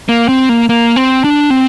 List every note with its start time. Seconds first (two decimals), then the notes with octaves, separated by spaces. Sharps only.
0.09 A#3
0.29 C4
0.49 A#3
0.69 A#3
0.96 C4
1.24 D4
1.50 C4